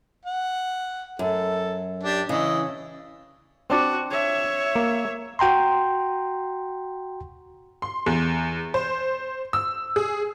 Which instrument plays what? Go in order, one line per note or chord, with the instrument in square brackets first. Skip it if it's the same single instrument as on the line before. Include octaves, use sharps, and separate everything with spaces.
[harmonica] F#5
[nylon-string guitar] F#2 [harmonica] A4
[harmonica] D4 G4
[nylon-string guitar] C#3 [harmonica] E3 D#5
[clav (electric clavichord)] C4 D4 D5 [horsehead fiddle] F#4
[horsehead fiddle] C#5 E5
[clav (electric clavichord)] A#3
[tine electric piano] F#4 G5 A#5 C6
[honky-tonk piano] C6
E2
C5
E6
G#4